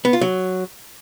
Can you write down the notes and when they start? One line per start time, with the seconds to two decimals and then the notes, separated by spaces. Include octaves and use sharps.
0.05 B3
0.13 F4
0.21 F#3